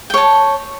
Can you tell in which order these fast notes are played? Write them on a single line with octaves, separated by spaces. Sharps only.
G5 C#5 A5